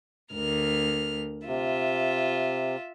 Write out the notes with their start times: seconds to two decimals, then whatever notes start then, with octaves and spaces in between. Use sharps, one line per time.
0.33 D2 A#4 F6
1.47 C3 F4 E5